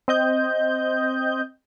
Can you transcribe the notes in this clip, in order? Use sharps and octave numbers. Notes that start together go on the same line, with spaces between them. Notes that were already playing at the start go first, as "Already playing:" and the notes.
C4 D#5 G6